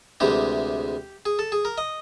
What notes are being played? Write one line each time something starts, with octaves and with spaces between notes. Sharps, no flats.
D2 C3 E3 G#3 G4
G#4
A4
G#4
A#4
D#5